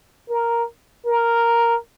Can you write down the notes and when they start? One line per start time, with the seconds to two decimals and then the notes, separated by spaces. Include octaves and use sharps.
0.28 A#4
1.05 A#4